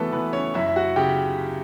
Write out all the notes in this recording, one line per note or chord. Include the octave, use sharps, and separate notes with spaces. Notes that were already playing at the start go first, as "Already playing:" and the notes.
Already playing: E3 F#3 A3 B3 A4 B4
E3 B3 B4
C#4 C#5
F#2 E4 E5
E5
F#4 F#5
C#3 G4 G5